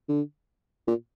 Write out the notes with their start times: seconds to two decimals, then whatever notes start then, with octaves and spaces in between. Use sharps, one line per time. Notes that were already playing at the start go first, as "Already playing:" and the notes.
0.09 D3
0.88 A#2